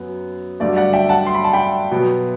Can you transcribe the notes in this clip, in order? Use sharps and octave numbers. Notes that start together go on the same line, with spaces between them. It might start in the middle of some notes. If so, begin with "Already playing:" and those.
Already playing: F#2 F#3 B3
G2 D3 F#3 A3 D5
D5 F#5
E5 G5
F#5 A5
C6
B5
A5
G5 B5
B2 F#3 B3